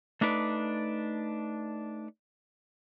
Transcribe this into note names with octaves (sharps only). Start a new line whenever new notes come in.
A3 D4 D#4 B4 D5